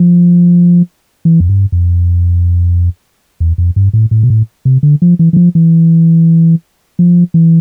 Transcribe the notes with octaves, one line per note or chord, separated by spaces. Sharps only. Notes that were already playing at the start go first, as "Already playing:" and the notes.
Already playing: F3
E3
F2
G2
F2
E2
F2
G2
A2
A2
B2
A2
C3
D3
F3
E3
E3
F3
E3
F3
E3